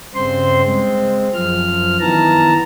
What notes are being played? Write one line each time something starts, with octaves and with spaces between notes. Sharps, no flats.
G2 C#3 C4 C5 C6
G#3 C4
F#2 F3 F6
D#3 E3 B3 A5 A#5